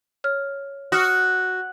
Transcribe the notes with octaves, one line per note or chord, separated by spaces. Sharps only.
C#5 F6
F#4 D#6 F6 C#7